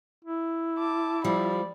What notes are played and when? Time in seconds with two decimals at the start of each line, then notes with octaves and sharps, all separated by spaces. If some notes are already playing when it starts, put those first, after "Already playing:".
0.25 E4
0.79 A5 D6
1.24 F3 G3 D5 B5